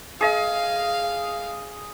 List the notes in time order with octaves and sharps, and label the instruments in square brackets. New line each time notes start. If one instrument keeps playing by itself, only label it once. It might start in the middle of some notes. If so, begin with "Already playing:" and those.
[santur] G#4 D#5 [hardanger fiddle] F5